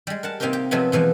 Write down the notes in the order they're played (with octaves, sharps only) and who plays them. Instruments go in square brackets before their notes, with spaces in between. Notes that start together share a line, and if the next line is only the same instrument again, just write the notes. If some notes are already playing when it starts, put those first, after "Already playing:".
[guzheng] G3 G#3
A#4 F#5 A5
C3 A#3 C4 D#4 G4 A#4
G4
C3 F3 F#3 G#3 A3 B3
B2 E3 F3 G#3